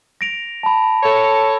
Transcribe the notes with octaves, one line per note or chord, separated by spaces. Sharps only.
A#6 D7 F7
A5 B5
A4 C#5